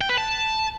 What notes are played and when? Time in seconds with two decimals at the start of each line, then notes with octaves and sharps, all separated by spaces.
0.01 G5
0.09 B4
0.18 A5